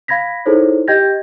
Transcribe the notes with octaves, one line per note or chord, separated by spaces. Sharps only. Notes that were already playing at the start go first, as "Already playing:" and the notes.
F5 B5 G#6 A#6 B6
D#4 E4 G#4 A4 C5 C#5
G4 D#5 G5 G6 G#6 A#6